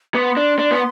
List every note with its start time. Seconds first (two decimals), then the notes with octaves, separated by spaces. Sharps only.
0.14 B3 C6 D6
0.37 D4
0.59 D4
0.71 B3